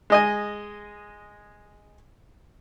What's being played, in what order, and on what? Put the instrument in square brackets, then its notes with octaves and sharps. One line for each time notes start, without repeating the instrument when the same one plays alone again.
[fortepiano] G#3 D#5 G#5